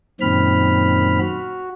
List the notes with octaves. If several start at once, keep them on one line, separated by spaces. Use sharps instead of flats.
F#2 A#2 D#3 C4 B5 F6
F#4